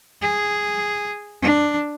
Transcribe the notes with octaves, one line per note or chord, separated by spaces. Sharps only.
G#4
D4